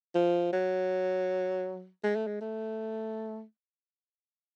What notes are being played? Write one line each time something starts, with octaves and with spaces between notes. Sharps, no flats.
F3
F#3
G#3
A3
G#3
A3